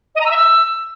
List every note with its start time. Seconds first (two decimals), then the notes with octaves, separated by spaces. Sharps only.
0.15 D#5
0.20 A#5
0.25 E6
0.30 E5
0.36 E6